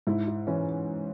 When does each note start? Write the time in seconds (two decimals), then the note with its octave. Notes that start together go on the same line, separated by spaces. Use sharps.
0.07 G#2 E4
0.27 E4
0.47 E3 C#4